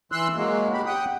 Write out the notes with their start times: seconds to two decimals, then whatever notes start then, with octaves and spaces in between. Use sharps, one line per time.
0.12 E3 C6 E6 F#6
0.35 F#3 G#3 A#3
0.74 G4 B5
0.86 F#5 G5 D#6